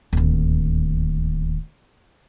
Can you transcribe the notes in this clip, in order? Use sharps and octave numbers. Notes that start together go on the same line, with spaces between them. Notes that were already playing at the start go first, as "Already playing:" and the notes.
D1 D#2